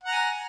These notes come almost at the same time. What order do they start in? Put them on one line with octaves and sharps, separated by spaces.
F#5 A#5 G#5